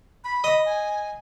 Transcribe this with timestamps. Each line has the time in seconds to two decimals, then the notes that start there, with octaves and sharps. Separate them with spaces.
0.24 B5
0.44 D#5
0.66 G#5